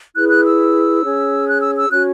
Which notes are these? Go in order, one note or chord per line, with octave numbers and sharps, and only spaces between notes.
E4 G#4 B4 F#6
F#6
E6
C#4 G#4 C#5
F#6
E6
E6
C#4 F#4 C#5 F#6